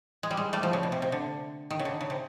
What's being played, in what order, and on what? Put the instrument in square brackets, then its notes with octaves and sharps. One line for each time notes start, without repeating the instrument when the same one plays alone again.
[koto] G#3
G3
G#3
G3 A3
F3
C#3
B2
C3
C3
D3
D#3
C#3
D3
C#3
C3